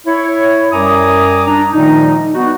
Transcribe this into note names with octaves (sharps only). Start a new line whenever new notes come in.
E4 C#5
F#2 G3 G#5 A#5 D6 D#6
D4 A#5
A#2 D#3 F3 G3 A3 D#4
B3 D#4 F#4